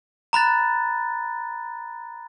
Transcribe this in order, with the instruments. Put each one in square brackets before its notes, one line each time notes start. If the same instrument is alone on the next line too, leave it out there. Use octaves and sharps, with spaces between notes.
[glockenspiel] A#5 B5 F#6 A6